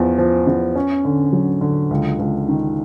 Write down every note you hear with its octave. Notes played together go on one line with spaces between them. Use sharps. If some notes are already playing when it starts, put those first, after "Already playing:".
Already playing: E2 F3
F3
E2
C#4
D3
F#3
D3
C#2
C#2
D#3